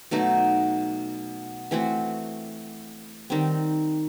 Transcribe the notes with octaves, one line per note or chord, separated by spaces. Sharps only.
B2 F#3 A3 D#4
E3 A3 C4 F#4
D#3 G3 C4